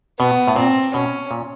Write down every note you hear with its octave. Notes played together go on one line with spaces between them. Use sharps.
B2 B3
A2
A#2 C4
B2 C#4
A#2